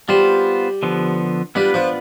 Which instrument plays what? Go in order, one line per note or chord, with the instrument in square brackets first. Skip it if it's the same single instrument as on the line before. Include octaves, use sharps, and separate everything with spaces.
[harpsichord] G3 [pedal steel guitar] B3 F4 C5
[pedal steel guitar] D3 F3 B3
[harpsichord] G3 [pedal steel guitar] B3 D4 F4 B4
[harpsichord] F3